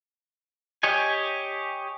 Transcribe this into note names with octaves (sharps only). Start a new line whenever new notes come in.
G4 C#5 D#5 G#5